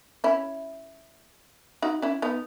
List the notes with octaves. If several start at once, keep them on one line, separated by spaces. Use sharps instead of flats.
C#4 E4
D#4 F#4
C#4 E4
B3 D#4